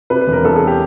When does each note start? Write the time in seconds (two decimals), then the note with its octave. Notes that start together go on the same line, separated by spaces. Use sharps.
0.10 C3 B4
0.21 B4
0.27 E1
0.33 A#4
0.45 E2 A4
0.56 G#4
0.67 G4